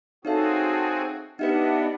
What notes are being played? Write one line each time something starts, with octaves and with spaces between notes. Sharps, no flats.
C4 D#4 F#4 G#4 A4 C#5 E5 F5
B3 D4 D#4 G4 B4 D#5 E5 F#5